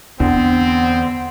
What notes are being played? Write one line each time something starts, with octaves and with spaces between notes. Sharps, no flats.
E2 D3 B3 C4